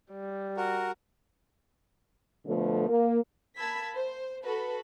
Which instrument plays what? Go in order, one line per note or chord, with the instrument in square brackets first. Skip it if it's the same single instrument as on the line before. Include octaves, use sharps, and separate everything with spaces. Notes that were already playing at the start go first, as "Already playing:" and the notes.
[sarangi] G3
[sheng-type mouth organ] F#4 A#4
[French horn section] B2 D3 F3 A3
A#3
[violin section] A#3 A5 B5 E6 G#6 B6
C5
F#4 A4 B4 B5